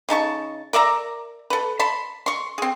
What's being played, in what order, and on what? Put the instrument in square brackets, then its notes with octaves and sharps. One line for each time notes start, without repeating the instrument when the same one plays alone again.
[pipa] C#3 D#4 A5 C#6
A#4 D5 E5 A#5
A4 B4
A5 B5 C6
C6 C#6
C4 G#4